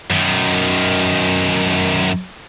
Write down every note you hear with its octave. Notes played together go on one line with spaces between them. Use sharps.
F#2 D#3